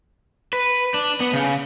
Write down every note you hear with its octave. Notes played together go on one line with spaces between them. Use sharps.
B4
D4
B3
C#3